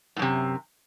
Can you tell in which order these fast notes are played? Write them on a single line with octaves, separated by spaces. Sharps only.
A2 F#2 C3